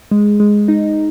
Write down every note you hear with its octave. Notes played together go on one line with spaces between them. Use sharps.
G#3
G#3
D#4